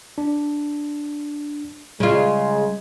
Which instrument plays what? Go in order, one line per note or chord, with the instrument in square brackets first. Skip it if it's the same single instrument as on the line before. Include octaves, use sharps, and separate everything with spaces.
[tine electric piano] D4
[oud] C#3 F4 [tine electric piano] G3 [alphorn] G#3